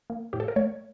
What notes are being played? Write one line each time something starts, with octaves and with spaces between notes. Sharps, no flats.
A#3
A2 G4
A4
A#4
A3 C#5